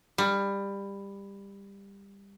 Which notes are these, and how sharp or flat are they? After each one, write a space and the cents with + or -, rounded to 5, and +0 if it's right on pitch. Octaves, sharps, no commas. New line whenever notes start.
G3 +20